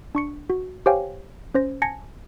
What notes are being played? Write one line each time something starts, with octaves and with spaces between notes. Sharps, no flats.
D4 C#6 C#7
F#4
G4 C5 C#5 F5 G5 G#5
C#4 C5 A#6
G#5 A5 G#6 A#6 C#7